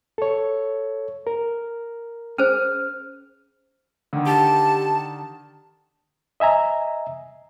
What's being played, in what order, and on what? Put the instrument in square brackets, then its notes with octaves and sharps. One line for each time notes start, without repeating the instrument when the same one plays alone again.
[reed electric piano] A4 C#5
A#4
[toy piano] C#4 G#4 C5 [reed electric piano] F6
[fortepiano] D3 D#3
[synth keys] G4 [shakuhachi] A5
[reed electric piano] D#5 E5 G#5 A#5